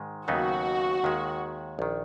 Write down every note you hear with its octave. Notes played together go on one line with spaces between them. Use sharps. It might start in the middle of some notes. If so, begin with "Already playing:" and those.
Already playing: G#2 D#3 G#3
D#2 C#3 F#3 B3 D#4 F#4
D#2 D#3 G#3
A#1 D#3